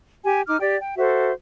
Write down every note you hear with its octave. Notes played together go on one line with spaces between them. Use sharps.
G4 G#5
D#4 D6 F6
G4 D5 G5
G5
F#4 A4 C5 E5